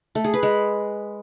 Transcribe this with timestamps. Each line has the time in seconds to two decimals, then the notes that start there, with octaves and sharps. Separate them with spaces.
0.15 A3
0.24 G#4
0.34 B4
0.43 G#3